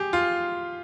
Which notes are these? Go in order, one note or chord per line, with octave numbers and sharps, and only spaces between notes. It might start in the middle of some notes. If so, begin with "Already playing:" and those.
Already playing: G4 G#4
F4